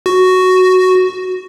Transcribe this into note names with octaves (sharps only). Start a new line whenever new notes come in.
F#4